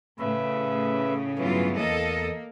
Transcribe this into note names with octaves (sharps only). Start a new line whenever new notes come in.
A2 C#3 B4 E5
G2 E3 F#3 B3 F4
E2 A#3 A4 D#5